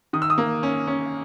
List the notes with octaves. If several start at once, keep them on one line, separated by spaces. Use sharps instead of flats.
D#3 D#6
E6
D#6
A#3
C#4
C#4